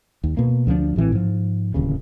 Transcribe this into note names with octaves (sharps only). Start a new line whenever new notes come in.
D#2
B2 A#3
D2 F3 F#3 D4
A1 A2 E3 C4
G#2 F3
D1 D#2 C#3